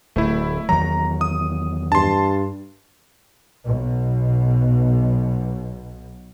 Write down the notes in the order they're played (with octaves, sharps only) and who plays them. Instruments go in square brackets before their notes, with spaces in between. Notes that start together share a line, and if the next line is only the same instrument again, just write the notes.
[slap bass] D1 [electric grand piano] A3 E4
[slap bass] E2 D#3 F#3 [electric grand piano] A#5
[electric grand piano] D#6
[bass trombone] G2 [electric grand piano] A5 C6
[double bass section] B1 B2